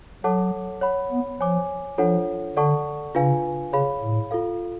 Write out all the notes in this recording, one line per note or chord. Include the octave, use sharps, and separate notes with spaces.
F#3 A4 C#5 F#5 A5 D6
C#5 F#5 B5
B3
F3 C#5 G#5 D6
F3 D4 F4 A4 C#5 F#5
D3 A4 D5 F#5 A5 C#6
C#3 D4 F4 B4 F5 G#5
C#3 G#4 C#5 F5 B5
A2
F4 A4 F5